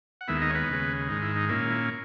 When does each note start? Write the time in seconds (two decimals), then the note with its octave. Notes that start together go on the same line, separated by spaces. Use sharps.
0.21 F#5
0.28 D#2 D#3 G#3 B3 E4 E5
0.41 D#4 D#5
0.50 C#5
0.55 B3 B4
0.68 D#2 C#3 G#3
1.09 G#2 D#3 G#3 D#4
1.22 E4
1.36 D#4
1.49 A#2 A#3 C#4 E4
1.59 D#4
1.70 E4